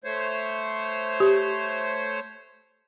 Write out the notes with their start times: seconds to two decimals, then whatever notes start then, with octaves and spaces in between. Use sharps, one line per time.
0.04 A3 C5 C#5
1.20 G4